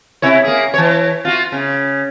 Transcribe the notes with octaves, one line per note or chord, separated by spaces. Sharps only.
C3 E4 C#5
A#3 G#4
E3 C#5
F4 F#4
C#3